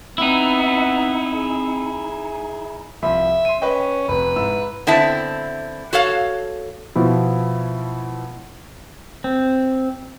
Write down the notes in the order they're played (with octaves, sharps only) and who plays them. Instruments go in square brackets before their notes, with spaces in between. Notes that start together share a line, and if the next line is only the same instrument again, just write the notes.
[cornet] B3 [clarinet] C4 [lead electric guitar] D#4 E4
[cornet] G#4
[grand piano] C2 F3 B5 [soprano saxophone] E5
[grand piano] C6 D#7
[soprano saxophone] C#4 [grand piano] B4 D#5 G5
[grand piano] F1 [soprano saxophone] B4
[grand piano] G#2 E4 E6
[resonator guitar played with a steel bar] D3 B3 C4 E4 E5 A5
F#4 A4 C#5 F5
[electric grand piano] B2 F3 E4
[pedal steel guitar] C4